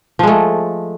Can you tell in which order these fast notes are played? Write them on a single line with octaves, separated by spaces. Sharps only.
F3 G#3 A3